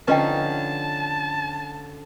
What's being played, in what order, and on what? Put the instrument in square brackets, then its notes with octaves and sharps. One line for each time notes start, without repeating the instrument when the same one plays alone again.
[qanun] D3 F3 D#4 [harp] C#4 [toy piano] B4 D#5 G5 [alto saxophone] A5